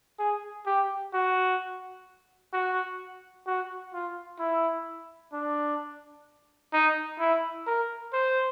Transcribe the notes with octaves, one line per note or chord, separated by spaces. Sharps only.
G#4
G4
F#4
F#4
F#4
F4
E4
D4
D#4
E4
A#4
C5